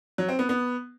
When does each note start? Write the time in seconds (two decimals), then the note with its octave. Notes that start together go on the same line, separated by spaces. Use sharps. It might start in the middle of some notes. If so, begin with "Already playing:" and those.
0.18 F#3
0.29 C4
0.39 B3
0.49 B3